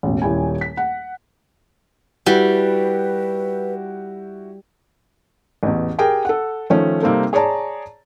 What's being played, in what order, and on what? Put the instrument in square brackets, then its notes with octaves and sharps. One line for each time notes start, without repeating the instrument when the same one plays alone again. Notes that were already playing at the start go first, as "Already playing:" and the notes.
[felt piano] E1 A1
D#1 E4 G5 G#5
B6
F#5
[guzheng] G3 [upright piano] E4 F#4 G4 [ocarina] B4
[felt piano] A1 E2
G4 G#4 A#4 G5 G#5
A4 F#5
D#3 F3 A3 C#4
C3 G3 A#3 C4 D#4 A4
G#4 C#5 D5 A5 A#5